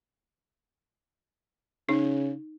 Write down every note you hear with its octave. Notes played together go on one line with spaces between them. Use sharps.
C#3 D#4